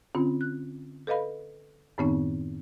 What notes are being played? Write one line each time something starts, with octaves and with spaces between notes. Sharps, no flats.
D3 C4 C#4 F4
F#6
A4 B4 D#5 F5 B5
F#2 A2 D#3 B3 C4 D#4